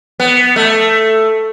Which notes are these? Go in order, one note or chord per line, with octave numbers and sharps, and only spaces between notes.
B3
A3